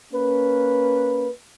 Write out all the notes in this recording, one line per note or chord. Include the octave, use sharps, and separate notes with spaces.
A#3 C#4 B4